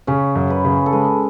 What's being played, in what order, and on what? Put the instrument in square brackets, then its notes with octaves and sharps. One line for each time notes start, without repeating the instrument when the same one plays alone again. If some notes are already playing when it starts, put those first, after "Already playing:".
[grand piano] C#3 [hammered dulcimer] C#4
[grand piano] F#2
[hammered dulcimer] B4
[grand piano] C#3
[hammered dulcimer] A4
[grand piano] G#3 [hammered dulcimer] B4